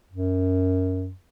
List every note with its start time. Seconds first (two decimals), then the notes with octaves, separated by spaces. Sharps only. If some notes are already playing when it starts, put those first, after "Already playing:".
0.12 F#2